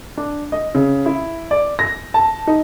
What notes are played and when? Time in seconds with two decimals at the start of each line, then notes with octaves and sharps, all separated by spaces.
0.18 D4
0.52 D#5
0.75 C#3
1.06 E4
1.51 D5
1.79 A#6
2.14 A5
2.47 D#4